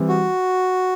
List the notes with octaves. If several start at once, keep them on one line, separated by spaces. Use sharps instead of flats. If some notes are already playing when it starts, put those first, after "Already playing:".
Already playing: E3 G3 C4
F#4